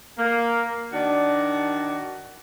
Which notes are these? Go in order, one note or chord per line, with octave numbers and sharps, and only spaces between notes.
A#3
D#3 D4 F#4 D5